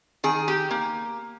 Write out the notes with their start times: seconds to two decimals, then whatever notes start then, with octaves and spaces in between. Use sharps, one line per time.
0.24 D#3 G#4
0.48 G4
0.71 A#3